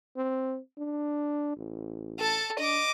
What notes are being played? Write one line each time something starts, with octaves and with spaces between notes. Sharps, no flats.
C4
D4
A1
A4 A5
D4 D#5 D6